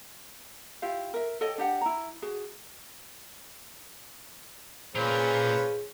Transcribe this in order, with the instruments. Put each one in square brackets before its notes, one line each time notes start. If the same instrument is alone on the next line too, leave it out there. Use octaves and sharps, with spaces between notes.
[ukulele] E4 F4 G4 F5
A#4 E5
A4 C#5 D#5 G5
D4 G4 F#5 G5
E4 A#5
F#4 G#4
[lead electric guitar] A#2 [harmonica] F3 C#4 B4 [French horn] G#4 [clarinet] C5